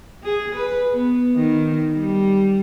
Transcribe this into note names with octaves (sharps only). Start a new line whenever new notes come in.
G#4
B4
B3
D#3
G3